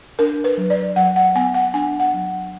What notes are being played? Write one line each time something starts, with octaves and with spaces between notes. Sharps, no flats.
D4 A#4
B4
F#3
D5
F#3 F#5
F#5
B3 G#5
F#5
D4 G#5
F#5
F#3